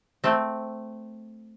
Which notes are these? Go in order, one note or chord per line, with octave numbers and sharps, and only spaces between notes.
A3 C4